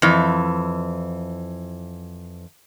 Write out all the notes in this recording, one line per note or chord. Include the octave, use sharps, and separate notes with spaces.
F2 E3